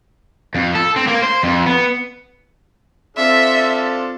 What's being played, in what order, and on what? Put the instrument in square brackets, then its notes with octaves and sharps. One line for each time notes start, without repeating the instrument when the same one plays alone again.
[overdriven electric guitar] F2
A4
C4
A#3
C5
F2
B3
[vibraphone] C4 C5 [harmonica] D4 F4 A4 [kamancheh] E5